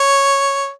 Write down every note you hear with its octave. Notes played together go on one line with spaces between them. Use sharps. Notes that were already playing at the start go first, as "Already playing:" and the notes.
Already playing: C#5